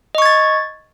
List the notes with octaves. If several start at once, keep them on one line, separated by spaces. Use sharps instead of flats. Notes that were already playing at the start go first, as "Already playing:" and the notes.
D#5 C#6 G#6 A6